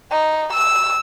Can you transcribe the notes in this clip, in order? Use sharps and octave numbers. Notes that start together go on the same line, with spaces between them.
D#4
E6